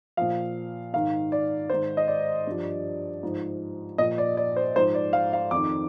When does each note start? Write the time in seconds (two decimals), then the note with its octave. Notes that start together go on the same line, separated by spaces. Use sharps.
0.17 A#2 F3 F5
0.93 G#2 D#3 F5
1.32 D5
1.70 G#2 D#3 C5
1.97 D#5
2.08 D5
2.47 G2 F3
3.23 G#2 F3
3.98 A#2 F3 D#5
4.18 D5
4.37 D5
4.56 C5
4.75 G#2 F3 C5
4.94 D5
5.13 F5
5.33 F5
5.51 F2 D#3 D6